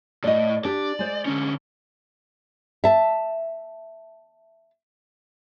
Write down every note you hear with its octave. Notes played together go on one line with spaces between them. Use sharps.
A2 D5 D#5
D4 G4 D5
G#3 C5
D3 C#4
E5 A5